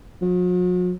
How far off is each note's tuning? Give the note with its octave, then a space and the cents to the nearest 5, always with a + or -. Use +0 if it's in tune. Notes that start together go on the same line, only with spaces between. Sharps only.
F#3 -45